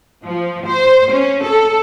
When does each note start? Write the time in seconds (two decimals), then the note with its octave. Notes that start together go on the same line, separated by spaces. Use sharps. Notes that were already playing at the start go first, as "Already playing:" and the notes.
0.24 F3
0.66 C5
1.11 C#4
1.42 A4